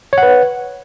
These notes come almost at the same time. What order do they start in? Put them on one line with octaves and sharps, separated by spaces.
C#5 F#5 B4